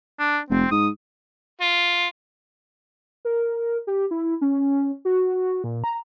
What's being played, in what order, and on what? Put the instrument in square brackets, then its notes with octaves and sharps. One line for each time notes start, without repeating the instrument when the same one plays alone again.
[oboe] D4
[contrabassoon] F1 [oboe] C4
[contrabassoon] G#2 [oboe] D#6
[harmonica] F4
[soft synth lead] A#4
G4
E4
C#4
F#4
A#2
A#5